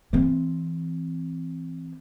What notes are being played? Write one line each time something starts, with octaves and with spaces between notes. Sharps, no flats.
E3 C4